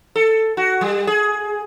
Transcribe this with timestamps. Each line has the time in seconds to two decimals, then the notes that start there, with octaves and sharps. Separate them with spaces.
0.16 A4
0.57 F#4
0.81 G3
1.07 G#4